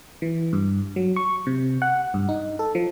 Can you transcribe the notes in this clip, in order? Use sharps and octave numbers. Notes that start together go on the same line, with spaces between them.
E3
G2
F#3
C#6
C3
F#5
G2
D#4
A4
F3